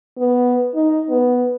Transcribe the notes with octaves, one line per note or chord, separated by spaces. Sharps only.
B3
D#4
B3